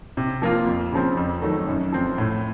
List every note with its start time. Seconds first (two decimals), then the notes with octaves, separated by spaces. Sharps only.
0.17 C3
0.42 F3 A#3 F4
0.67 F2
0.93 C#3 F3 C4
1.17 F2
1.42 D#3 F#3 A3
1.68 F#2
1.93 F3 C4
2.18 A2